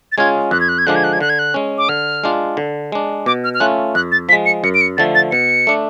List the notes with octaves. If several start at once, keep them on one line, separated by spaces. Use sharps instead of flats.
A6
G#3 C#4 F4 G#6
F2 F#6
G#6
F#6
G#6
D3 F3 G#3 D4 F#6
G#6
F#6
G#6
D3 F#6
G#6
F#6
G#3 C#4
D6
D3 F6
G#3 D4 F4
D3
G#3 D4
B2 D6
F6
F6
A3 C#4 F4 F#6
F2 F#6
A6
F3 G#3 B6
C#7
F#2 C#7
D7
C#7
D3 F3 A3 A6
A6
B2 C#7
A3 D4